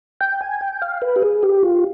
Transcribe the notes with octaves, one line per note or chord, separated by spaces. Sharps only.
G5
G#5
G5
F5
B4
G4
G#4
G4
F4